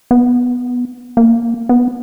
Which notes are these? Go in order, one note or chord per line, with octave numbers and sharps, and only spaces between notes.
B3
A#3
B3